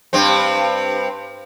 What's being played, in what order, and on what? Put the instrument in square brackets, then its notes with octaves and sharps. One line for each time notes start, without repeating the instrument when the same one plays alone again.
[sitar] G2 C4